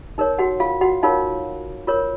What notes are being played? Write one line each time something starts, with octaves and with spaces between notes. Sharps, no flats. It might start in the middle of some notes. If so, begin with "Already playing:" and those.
D#4 A#4 C#5
F#4 F#5
F4 F5
F#4 F#5
D#4 F4 A#4 C#5 F5
F4 A#4 C#5